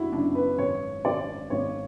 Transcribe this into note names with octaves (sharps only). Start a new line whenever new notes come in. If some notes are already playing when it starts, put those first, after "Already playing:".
Already playing: F#1 D4 E4 F#4
F#1 D4
B4
G#1 C#5
G#1 D5
G#1 C#5